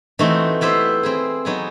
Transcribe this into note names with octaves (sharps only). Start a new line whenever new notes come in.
E3 A3 C4 D#4 F#4
B3 E4 G4 C5
C4 E4 G#4
F#3 B3 D#4 G#4